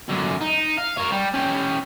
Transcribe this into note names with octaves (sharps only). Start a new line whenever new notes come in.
F#2 D3
D#4
F5
A#4 C#5
G3
C#4 G4